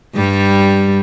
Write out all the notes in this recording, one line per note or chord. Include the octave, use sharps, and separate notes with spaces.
G2 G3